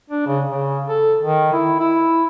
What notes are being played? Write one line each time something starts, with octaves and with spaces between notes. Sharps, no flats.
D4
C#3
C#3
A4
D#3
E4
E4